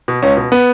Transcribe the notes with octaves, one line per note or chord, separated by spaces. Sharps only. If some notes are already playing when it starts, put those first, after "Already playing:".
B2
C#2 C#4
B2
B3